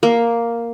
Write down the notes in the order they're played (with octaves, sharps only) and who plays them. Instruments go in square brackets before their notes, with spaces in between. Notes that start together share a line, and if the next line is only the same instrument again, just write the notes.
[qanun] A#3